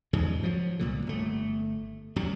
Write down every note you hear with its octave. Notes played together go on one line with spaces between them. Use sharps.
E2 G#2 C#3 F3
F3 F#3
C2 A#2 D3
G1 A3
D1 F#2 F#3 G3